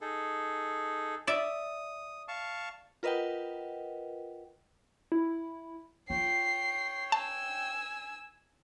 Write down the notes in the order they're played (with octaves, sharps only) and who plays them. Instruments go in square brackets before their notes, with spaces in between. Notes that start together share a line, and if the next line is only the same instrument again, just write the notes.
[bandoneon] D#4 G#4 A4
[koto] D5 E5 [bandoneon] D#6
[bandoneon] F5 A5 C#6
[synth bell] F4 A#4 B4 D#5 F#5 G5
[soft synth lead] E4
[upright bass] F4 [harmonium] C#5 G5 [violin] C7
[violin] G#5 E6 [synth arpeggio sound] A5